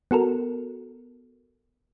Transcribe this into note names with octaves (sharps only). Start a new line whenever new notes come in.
B3 F#4 A4 A#4